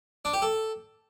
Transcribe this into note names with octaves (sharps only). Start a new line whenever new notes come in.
D4
G4
A4